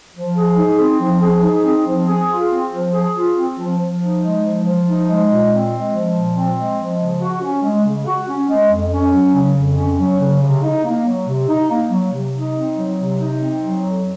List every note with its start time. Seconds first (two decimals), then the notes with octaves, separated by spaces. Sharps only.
0.15 F3
0.36 G#4
0.57 D#4
0.79 C4
1.00 F3
1.22 G#4
1.43 D#4
1.65 C4
1.86 F3
2.07 G#4
2.29 F4
2.50 C4
2.71 F3
2.92 G#4
3.14 F4
3.35 C4
3.57 F3
3.78 F3
4.00 D#4
4.21 G#3
4.42 F3
4.64 F3
4.86 D#4
5.06 G#3
5.28 A#2
5.50 C4
5.71 G#3
5.92 F3
6.14 A#2
6.35 C4
6.56 G#3
6.78 F3
6.99 C#3
7.20 F#4
7.41 C#4
7.63 G#3
7.84 C#3
8.06 F#4
8.28 C#4
8.49 G#3
8.70 F2
8.92 C#4
9.13 F#3
9.35 C#3
9.56 F2
9.77 C#4
9.99 F#3
10.19 C#3
10.42 C3
10.62 D#4
10.84 A#3
11.06 F#3
11.27 C3
11.48 D#4
11.70 A#3
11.91 F#3
12.12 C3
12.33 D#4
12.56 C4
12.77 F#3
12.98 C3
13.19 D#4
13.41 C4
13.62 F#3
13.83 F2